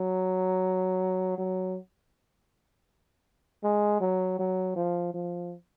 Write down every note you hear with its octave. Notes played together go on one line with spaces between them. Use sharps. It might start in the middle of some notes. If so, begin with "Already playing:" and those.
Already playing: F#3
F#3
G#3
F#3
F#3
F3
F3